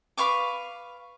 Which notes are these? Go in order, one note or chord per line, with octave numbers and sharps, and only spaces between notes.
B4 F5 C#6 D6